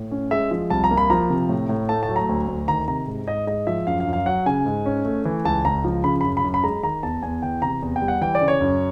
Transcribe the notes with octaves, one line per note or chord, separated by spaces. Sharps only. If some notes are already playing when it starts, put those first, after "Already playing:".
Already playing: A2
C#4
G#3 E5
F3
C2 A5
A#5
A#3
B5
F3 A#5
C3
A2
A2
A3 A5
A5
F#3
A#5
D2
D2
D#3 A#5
C3 A#5
G#2
G#2 D#5
G#3 D#5
F3 E5
F#2 F5
F5
F#2
F5
F#3 F#5
C#3 G#5
G#2
C#4
A3
E3
C#2 A5
C#2 A#5
F3
C#3 B5
F#2 B5
B5
F#2
B5
G#3 A#5
D#3 A#5
E2 A5
E2 G#5
E3 G5
C3 A#5
E2
G5
G3
F#5
E3 G5
D5
C#3
C#5
F#2